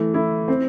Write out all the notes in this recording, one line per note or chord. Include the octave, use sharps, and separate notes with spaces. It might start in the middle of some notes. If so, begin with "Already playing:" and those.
Already playing: E3 A3
E4
C4